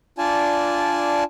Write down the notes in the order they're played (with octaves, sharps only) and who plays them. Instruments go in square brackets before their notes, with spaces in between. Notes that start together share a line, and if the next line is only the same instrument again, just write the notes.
[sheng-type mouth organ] D4 F4 D5 G#5 A5